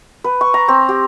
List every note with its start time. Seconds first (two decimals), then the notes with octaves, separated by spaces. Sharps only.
0.24 B4
0.41 C#6
0.54 A#5
0.68 C4
0.89 G4